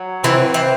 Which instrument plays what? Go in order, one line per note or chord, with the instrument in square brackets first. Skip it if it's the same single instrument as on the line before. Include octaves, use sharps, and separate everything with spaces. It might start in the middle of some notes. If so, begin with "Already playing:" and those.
Already playing: [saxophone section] F#3
[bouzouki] E3 [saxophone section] C4
[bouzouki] E3 [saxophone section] C4